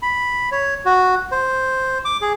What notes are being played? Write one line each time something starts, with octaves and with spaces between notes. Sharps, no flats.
B5
C#5
F#4
C5
D6
G#4